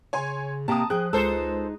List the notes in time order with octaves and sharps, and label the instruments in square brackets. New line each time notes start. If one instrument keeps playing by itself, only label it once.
[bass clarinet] C#3 [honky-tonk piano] C#5 G#5 C6
[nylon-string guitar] C3 G4 [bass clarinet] A#3 [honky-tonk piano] A5 A#5 D#6
[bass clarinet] F3 [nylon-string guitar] G#4 G5 [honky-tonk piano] F#6
[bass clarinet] C#2 [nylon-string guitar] G#3 D#4 [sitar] A4 C5